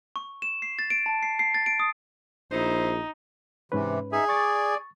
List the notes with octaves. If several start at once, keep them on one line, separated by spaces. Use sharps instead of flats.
C#6
E7
C7
A6
D7
A5
C7
C7
A6
D7
D#6
A#1 D#4 E4 C5
G#2 C3 E3 C#4 B4
D#4 G#4 E5
D5 C#6 A6